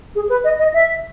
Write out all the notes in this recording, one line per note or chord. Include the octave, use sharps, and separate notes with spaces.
G#4
B4
D#5
D#5
E5